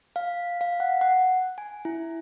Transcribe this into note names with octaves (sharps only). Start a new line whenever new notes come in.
F5
F5
F#5
F#5
G#5
E4